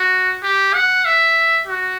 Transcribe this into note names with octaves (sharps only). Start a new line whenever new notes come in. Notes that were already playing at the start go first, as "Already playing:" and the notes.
Already playing: F#4
G4
F#5
E5
F#4